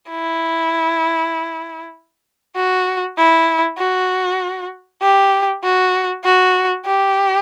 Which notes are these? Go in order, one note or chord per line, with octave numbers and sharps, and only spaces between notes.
E4
F#4
E4
F#4
G4
F#4
F#4
G4